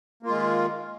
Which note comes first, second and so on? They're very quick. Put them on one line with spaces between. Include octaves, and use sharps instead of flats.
A#3 F4 G#3 D#3